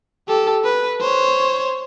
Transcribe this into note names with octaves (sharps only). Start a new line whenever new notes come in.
G4 A4
B4
C5 C#5